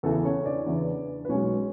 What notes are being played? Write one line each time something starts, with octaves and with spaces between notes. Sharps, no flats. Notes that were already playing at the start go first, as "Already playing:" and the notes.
E2 C#3 E3 B3 A4
C#4 C#5
D4 D5
E2 C#3 E3 B3
B4
B1 B2 G#3 B3 C#4 C#5